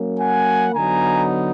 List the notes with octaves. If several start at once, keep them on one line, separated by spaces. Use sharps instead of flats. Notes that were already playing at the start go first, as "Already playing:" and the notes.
Already playing: F#3 A#3 C#4
F#5 G#5
D3 F#3 B3 D#4 G#5 A#5